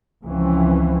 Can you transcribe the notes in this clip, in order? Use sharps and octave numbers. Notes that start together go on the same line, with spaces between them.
C#2 E3 F3 C4 C#4